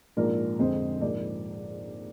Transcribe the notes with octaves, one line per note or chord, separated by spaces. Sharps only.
A#1 G#2 F3 A#4 D5
F2 D3 G#3 C4 C5 D#5
A#1 G#2 F3 A#4 D5